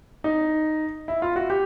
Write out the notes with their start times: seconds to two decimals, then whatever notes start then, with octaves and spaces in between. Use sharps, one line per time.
0.24 D#4
1.08 E4
1.22 F4
1.36 F#4
1.50 G4